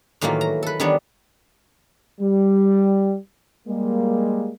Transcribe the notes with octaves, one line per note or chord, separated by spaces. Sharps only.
A2 D#3 E3 F#3 A#3 F4
A#5
A4 B4
D#3 E3 G3 B3 D4 C#5
G3
G3 G#3 A#3